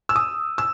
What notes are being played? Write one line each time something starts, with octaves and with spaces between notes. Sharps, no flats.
E6
D#6
E6